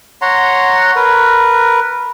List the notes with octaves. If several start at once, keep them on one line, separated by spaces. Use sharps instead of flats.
C#5 F#5 A#5 C6
A#4 B4